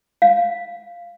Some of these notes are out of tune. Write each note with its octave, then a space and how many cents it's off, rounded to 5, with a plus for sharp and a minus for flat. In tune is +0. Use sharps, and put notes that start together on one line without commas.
F5 -10